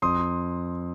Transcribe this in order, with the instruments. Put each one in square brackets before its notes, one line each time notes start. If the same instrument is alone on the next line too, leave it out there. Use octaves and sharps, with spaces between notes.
[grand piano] F2 C6 D#6